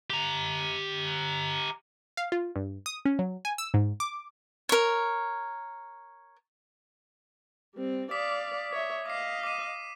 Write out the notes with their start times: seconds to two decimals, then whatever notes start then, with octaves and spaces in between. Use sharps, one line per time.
0.10 G4 A#5
2.17 F5
2.32 F4
2.56 G2
2.86 D#6
3.05 C#4
3.19 F#3
3.45 G#5
3.58 E6
3.74 G#2
4.00 D6
4.69 A#4 C#5
7.75 G3 C4
8.11 D5 F5 D6 D#6 B6
8.72 C#5 E5
9.06 D#5 F5 D6 C7
9.43 D6 C7 D#7